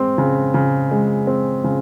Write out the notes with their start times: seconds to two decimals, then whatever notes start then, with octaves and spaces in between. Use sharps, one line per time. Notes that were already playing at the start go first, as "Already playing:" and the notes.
Already playing: G#3 C4
0.18 C#3
0.54 C#3
0.91 G#3
1.27 C4
1.64 C#3